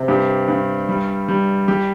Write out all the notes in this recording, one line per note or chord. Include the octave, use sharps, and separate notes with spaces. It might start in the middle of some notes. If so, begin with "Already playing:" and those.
Already playing: C3
G2 G4
G2
G3
G3
G3 G4